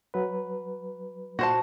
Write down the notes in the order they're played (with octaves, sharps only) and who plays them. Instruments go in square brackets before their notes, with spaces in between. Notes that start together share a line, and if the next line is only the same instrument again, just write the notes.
[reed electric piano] F#3 B4
[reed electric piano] A#2 [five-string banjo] F#4 C5 A5